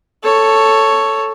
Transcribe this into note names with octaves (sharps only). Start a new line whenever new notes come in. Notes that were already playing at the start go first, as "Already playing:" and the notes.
A4 C#5